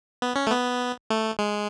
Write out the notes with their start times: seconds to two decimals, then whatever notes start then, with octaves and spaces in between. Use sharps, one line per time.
0.22 B3
0.36 C#4
0.47 A3
0.51 B3
1.10 A3
1.39 G#3